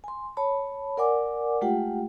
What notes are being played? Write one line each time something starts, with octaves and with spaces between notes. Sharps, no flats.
G#5 C6
C#5 A5 B5
A#4 D5 F#5 G#5 D6
G#3 A3 F4 G4 F#5 G5